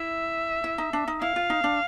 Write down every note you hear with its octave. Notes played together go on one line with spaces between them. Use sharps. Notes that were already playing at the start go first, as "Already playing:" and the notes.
Already playing: E4 E5
E4
D#4
D4
D#4
E4 F5
F4
D#4
D4